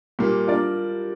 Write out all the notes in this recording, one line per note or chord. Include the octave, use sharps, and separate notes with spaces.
A#2 G3 A#3
D4 F4 A#4 D5